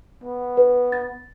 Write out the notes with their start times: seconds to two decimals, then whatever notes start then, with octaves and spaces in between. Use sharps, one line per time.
0.24 B3
0.57 B4
0.92 A6